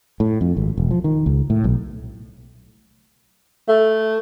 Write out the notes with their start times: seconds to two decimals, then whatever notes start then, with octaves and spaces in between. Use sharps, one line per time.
0.20 A2
0.41 F2
0.57 G#1
0.78 E1
0.91 F3
1.04 D#3
1.26 C#2
1.50 A2
1.64 B1
3.69 A3